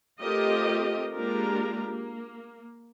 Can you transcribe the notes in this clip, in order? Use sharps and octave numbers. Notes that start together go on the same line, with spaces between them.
A3 C4 F4 G4 A#4 D#5
G#3 A#3 D4 F4 G4 A#4
A#3